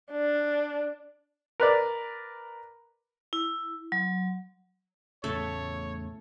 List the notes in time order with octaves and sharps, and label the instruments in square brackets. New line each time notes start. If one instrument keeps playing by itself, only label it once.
[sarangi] D4
[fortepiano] A#4 B4 D5
[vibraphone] E4
F#3
[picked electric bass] E2 A2 C#3 [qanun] A3 A4 [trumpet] C#5